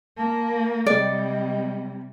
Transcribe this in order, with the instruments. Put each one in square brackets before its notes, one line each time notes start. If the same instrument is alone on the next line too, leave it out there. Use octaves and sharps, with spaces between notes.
[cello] A#3 [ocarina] A5
[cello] C3 G3 [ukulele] D5 [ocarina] D#5